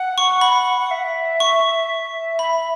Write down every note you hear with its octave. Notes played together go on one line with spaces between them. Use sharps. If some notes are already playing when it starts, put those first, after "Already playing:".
Already playing: F#5
C#6
B5
F#5
E5
C#6
B5